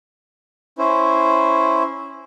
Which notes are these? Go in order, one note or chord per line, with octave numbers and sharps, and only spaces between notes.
C#4 E4 C5